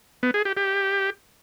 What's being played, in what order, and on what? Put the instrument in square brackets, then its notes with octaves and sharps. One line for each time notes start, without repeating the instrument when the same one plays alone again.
[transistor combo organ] B3
G#4
G4
G4